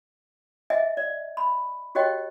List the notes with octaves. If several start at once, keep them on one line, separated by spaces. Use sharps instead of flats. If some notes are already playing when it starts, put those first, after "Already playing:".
D#5 E5 G#5
D5
B5
F#4 G4 C#5 D#5 G5